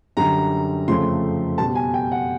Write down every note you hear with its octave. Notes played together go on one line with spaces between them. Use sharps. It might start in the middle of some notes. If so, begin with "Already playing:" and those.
F#2 D3 G3 A#5
F2 C#3 F3 A3 C6
B2 G3 A5
G#5
G5
F#5